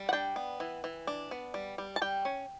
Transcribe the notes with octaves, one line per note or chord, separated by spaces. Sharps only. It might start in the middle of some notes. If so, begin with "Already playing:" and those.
Already playing: G3
F#5
D4 G5
B3
E3
E3
D4
B3
G3
G3
A5
G3 G5
C#4